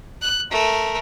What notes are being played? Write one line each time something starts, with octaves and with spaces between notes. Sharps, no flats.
F#6
A3 A#4